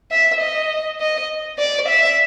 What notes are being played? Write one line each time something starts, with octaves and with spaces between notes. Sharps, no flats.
E5
D#5
D#5
D5
E5